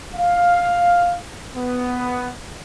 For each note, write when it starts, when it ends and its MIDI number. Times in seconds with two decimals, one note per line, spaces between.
0.15 1.17 77
1.55 2.30 59